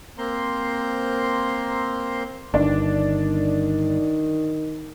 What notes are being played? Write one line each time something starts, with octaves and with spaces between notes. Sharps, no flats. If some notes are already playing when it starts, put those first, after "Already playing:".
A#3 C4 C5 A#5 C6
G1 D#3 D4